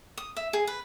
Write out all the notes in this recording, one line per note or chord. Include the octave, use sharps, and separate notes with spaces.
D#6
E5
G#4
B4